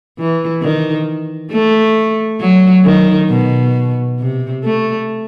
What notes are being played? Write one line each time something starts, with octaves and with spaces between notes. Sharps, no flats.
E3
D#3
A3
F#3
D#3
B2
C3
A3